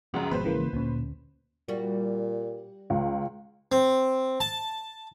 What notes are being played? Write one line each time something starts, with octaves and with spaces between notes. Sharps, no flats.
C#2 F#2 F3 C#4 F#4
G#1 B2 F3 G#3 B4 C5
C#3 E3 A#3
D2 A#2 C#4
A#2 G3 F#4
C#2
C4
A5